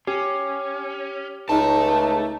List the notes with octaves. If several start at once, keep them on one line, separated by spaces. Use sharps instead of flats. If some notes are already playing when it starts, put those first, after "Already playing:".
C#4 G4
C#2 A3 D#4 A5